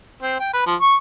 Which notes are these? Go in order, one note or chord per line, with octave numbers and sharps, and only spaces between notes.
C4
G5
B4
F3
C#6